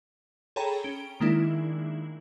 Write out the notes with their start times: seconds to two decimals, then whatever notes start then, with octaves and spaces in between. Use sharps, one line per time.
0.56 G#4 A4 C#5 G5 A#5 B5
0.84 C#4 D7 G7
1.20 D#3 G#3 A#3 D4 E4